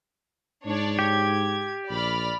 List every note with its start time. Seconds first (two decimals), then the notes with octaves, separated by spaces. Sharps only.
0.66 G#2 D4 C#5 D5
0.99 G4 G#6
1.90 A#1 D5 B5 F6